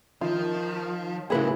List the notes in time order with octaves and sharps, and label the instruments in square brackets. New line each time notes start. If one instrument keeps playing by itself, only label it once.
[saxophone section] D#3 [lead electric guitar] F3 [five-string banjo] F4
[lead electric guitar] A2 C#3 [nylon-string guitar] F#3 A#3 E4 [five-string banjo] G#4 B4